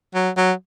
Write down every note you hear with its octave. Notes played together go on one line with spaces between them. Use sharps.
F#3
F#3